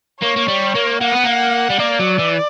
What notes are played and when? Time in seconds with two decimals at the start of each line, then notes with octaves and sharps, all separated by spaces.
0.21 A#3 C#5
0.37 A#3
0.48 G3
0.75 A#3
1.01 A#3 F#5
1.12 B3
1.24 A#3
1.70 G3
1.79 A#3 D5
2.00 F#3
2.19 E3